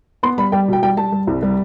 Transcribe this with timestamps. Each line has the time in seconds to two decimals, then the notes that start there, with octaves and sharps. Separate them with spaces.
0.23 B3 C6
0.38 G3 B5
0.52 G3 G5
0.68 B2 G5
0.82 G3 G5
0.97 G3 A5
1.12 G3
1.27 C2
1.43 G3